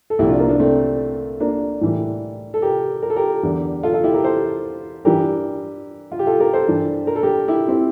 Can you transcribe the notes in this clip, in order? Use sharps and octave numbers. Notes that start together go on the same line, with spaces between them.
A4
C2 A#2 F3 E4 G4
D4 F4
A#3 D4
A#3 D4
A3 C4
A#3 D4
A2 E3 G3
A4
G4 A#4
A#4
A4
G4 A#4
E2 D3 G3
F4 A4
F4 A4
E4 G4
G4 A#4
A4 C5
G2 E3 G3 G4 A#4
F4
G4
F4 A4
G4 A#4
A4 C5
G2 E3 G3
A#4
A4
G4 A#4
E4 G4
C4 E4